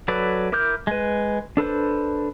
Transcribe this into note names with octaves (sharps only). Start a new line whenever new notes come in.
F#3 A4 B4 D5
E4 A#4 D6 F6 G6
G#3 B4
D4 A4 B4 C5